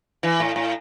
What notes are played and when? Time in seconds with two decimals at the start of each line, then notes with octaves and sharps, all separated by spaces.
0.23 E3
0.40 A2
0.56 A2